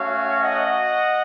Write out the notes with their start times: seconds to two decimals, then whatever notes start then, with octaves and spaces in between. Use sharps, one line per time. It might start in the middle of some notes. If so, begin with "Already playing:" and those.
Already playing: A3 C#4 F#4 C#5 F5
0.43 D#5 F#5